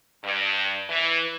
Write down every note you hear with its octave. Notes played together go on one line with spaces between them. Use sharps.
G2
E3